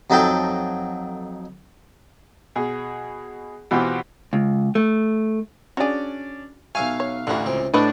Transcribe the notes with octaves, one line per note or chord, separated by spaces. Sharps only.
F2 F#3 D#4 A4 G5 A5
B2 G#4
B2 E3 B3 C4 F4 G4
C#2
A3
C#4 D4 F#4 G#4 D5
B1 E5 F5 G#5 C#6
C#5
A1 D2 A3 D4 E4 F#4
C#2 C4 G5
A2 A3 D4 B4 C#5 D#5